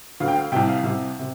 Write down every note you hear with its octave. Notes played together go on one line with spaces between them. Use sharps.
D2 D3 F5
G5
F5
C2 C3 G5
F5
C2 C3
C3